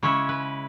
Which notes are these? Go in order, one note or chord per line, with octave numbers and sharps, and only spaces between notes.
C#3 G#3 C#4 E4 C#5
B4